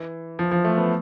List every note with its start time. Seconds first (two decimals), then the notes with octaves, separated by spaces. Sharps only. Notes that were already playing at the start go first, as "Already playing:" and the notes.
Already playing: E3
0.39 F3
0.51 F3
0.64 A3
0.78 B3